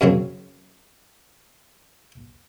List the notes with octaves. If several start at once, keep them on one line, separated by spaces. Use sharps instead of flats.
F#2 C#3 F#3 C4